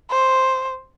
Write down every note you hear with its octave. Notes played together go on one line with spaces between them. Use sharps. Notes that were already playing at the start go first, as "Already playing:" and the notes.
C5